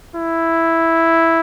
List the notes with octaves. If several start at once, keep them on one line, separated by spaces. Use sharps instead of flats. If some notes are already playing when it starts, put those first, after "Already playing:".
E4